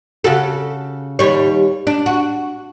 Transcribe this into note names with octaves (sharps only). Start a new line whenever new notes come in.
C#3 F#4 A4
D#2 G3 C#5
D4
F#4